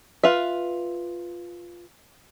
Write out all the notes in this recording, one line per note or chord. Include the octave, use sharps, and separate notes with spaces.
F4 B4 E5